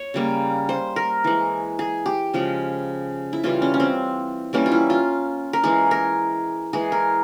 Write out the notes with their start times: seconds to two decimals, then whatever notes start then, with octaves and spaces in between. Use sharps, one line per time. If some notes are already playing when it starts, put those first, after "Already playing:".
Already playing: C#5
0.14 C#3 G3 A#3
0.69 C5
0.96 A#4
1.24 E3 G#3
1.79 G#4
2.06 G4
2.34 C#3 F3 G#3
3.33 E4
3.43 C#3 E3 G3 F4
3.62 C#4
3.74 C#4
3.80 C4
4.53 E3 G3 A#3 C#4
4.66 F4
4.72 E4
4.90 F4
5.53 A#4
5.63 E3 G#3 G#4
5.91 A#4
6.73 E3 G#3 G#4
6.92 A#4